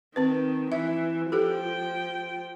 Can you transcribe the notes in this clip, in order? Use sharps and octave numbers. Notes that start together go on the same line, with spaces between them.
D#3 C4 B4
E3 E5
F3 F4 G4 A4 G5